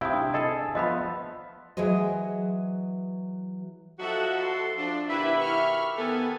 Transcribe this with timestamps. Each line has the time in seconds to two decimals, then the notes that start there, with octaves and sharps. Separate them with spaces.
0.01 C3 E4 F5 G5 D#6
0.13 D4
0.34 G#4 A4 D#5
0.75 F3 B3 D#5 E5 B5
1.77 E3 F#3 G#4 C5 D#5
3.99 F3 D#4 F#4 A4 E5 F#5
4.39 C6
4.76 F3 D4
5.08 B2 D#3 E4 G4 B4 E5 B5
5.38 C#6 F6
5.97 D#3 B3 A4 G#5